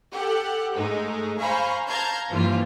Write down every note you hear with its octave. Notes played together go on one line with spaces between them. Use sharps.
G4 A4 F#5
G#2 G#3 A3 D#4
C5 F5 G#5 A#5 B5 C#6
F5 A5 A#5 G6 G#6
G2 E3 F3 G3 A#3 F4